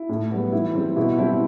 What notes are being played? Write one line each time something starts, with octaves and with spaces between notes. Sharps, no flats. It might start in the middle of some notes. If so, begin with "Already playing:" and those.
Already playing: E4
A2
G3 B3
E3 E4
G3 C4
B2 E4
G3 C4 E4